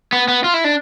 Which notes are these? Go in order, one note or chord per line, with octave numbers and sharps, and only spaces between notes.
B3
B3
F4
E4
D4